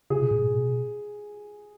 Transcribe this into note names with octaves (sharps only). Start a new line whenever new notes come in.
C#3 G#4
B2
A2
B2